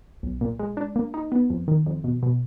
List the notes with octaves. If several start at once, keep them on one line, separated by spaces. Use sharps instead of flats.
B1
A#2
G#3
D4
A#3
D#4
B3
F2
D#3
F2
B2
B2